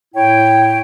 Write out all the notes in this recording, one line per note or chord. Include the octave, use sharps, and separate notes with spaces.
A2 E4 C#5 G5